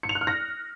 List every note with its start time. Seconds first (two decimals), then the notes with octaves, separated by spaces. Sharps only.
0.03 C#7
0.09 F7
0.15 F#6
0.21 F6
0.27 A#6